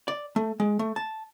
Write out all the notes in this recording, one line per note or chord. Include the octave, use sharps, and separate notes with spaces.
D5
A3
G#3
A3
A5